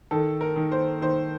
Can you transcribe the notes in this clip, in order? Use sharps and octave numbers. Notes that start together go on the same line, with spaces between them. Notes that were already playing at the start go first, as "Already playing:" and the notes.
D#3 A4
A#4
D#3
C5
D#3 C5